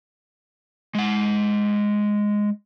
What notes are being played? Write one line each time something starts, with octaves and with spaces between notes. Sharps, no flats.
G#3 F#5